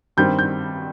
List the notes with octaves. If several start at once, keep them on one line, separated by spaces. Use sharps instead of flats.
G2 D#3 G3 C4 G6
G6